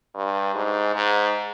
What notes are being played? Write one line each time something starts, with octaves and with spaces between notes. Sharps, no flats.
G2
G#2
G#2